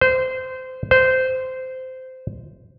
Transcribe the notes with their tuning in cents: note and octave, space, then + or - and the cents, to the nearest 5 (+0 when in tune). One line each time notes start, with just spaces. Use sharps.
C5 -20
C5 -15